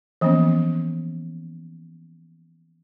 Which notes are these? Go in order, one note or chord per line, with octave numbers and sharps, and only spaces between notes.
E3 F3 A#3 B3 C#4